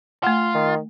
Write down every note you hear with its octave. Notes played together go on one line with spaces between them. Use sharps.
A3 F4 F#5
D#3